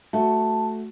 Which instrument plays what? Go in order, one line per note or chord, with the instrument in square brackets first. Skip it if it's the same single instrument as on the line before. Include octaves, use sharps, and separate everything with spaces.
[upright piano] A3 F#4 [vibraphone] A5